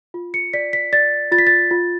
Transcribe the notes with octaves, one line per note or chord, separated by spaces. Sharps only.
F4
C#7
D5 B6
B6
D5 A6
F4 A6
B6
A6
F4